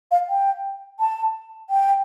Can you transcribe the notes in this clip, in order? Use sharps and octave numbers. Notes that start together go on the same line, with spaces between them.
F5
G5
A5
G5